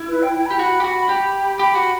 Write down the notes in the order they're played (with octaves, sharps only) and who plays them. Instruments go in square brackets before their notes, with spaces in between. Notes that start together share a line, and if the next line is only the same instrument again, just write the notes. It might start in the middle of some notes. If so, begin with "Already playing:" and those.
Already playing: [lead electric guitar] E4
[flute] B4
G5
G5
[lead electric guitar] G4 [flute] B5
[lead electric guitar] F#4
G4
F#4
G4
[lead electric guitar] G4 [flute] B5
[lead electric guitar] F#4